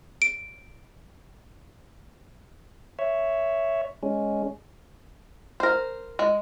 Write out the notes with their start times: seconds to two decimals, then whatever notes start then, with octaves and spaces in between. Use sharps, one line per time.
0.22 D7
2.99 C#5 E5
4.03 G#3 C#4
5.60 A#4 C5
6.19 G#3